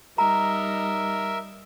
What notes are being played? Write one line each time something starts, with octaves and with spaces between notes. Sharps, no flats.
G3 D#4 A#4 E5 A#5